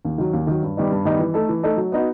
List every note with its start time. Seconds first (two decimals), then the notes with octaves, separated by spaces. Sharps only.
0.05 D#2
0.18 D#3 F#3
0.33 D#2
0.47 D#3 F#3
0.63 G2
0.77 D#3 G3 B3 D#4
0.92 G2
1.05 D#3 G3 B3 D#4
1.19 E3
1.34 A3 D#4 A4
1.49 E3
1.63 A3 D#4 A4
1.77 F#3
1.92 B3 D#4 F#4